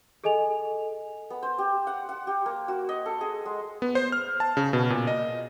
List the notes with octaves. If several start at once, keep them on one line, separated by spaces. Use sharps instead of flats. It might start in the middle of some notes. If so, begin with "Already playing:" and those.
G#4 A4 D#5 G#5 F7
B3
C5
G4
F#5
F#5
G4
A#3
F#4
D#5
A4
G#4
G#3
B3
C5
F6
A5
C#3
B2
A#2
D#5